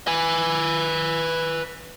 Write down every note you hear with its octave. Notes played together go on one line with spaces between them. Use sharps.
B4 G#5